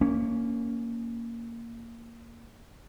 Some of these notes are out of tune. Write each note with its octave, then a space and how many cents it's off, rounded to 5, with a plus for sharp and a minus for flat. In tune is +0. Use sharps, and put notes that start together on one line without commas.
A#3 -10 C#4 +10